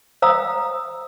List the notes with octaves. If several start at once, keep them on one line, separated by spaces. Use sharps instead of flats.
C5 F5 A#5 D#6 E6